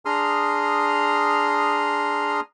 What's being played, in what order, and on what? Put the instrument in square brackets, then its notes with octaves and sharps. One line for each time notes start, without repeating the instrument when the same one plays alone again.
[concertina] D4 G#4 A#5 C6 D#6 F6